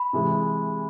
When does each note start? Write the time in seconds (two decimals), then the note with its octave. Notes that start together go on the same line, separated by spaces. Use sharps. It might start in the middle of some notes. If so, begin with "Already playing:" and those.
Already playing: B5
0.13 C3 E3 G#3